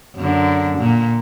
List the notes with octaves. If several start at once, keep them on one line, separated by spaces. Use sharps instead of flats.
F#2 D3
A#2